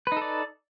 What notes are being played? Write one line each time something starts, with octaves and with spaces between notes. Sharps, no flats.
D#4 A4 B4 D5